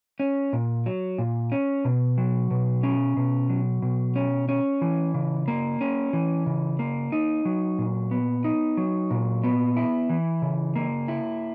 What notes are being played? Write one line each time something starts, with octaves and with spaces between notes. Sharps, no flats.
C#4
A#2
F#3
A#2
C#4
B2
F#3
B2
C#4
B2
F#3
B2
C#4
C#4
E3
C#3
A#3
C#4
E3
C#3
A#3
D#4
F#3
A#2
B3
D#4
F#3
A#2
B3
E4
E3
C#3
A#3
E4